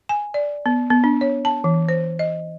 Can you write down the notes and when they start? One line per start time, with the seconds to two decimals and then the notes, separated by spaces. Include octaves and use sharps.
0.09 G#5
0.34 D5
0.66 B3
0.90 B3
1.04 D4
1.21 C#5
1.45 A5
1.64 E3
1.89 C5
2.19 D#5